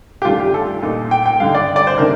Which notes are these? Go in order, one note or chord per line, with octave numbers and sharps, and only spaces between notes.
G4
G2 D#3 A3 D4 F4
G4
A4
A#2 A3 D#4
G5
G5
G2 D3 A3 D#4 F5
D5
D5
C5
C3 D#3 A3 D4 A#4